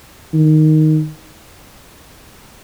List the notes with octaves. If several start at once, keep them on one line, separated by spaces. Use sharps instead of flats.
D#3